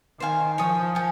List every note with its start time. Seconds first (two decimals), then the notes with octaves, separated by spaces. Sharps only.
0.20 D#3 C5 F5 G#5
0.58 F3 C#5 G#5 D#6
0.95 C#5 G#5